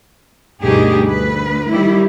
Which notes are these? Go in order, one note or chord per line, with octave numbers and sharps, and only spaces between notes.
D2 G2 B2 D#3 G4 G#4
D2 B4
D#3 F#3 G3 E4 G4